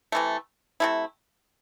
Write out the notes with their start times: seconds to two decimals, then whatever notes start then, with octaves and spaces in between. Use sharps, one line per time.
0.12 C3 E3 A3
0.80 C3 A3 E4